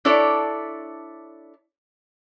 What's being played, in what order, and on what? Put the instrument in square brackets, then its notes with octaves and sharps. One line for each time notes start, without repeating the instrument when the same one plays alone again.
[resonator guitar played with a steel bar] D4 E4 A4 C#5 D5